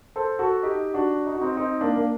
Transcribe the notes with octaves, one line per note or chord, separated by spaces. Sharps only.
A4 C5
F#4 A4
D#4 G4
D4 F#4
D#4
F#4
C4 D#4
C4 D#4
A#3 D4
A#3